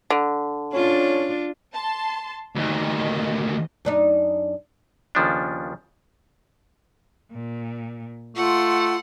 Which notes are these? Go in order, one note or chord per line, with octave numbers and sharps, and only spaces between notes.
D3
C#4 D4 F4
A5 C6
D2 D#3 D#5
F#2 D4 D#4
D#2 C#3 F3 B3 D4
A#2
A3 F4 F#5 C6